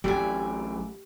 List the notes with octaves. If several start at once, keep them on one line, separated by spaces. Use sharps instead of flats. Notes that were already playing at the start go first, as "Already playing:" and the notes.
A1 F#3 A3 G4 D5 G#5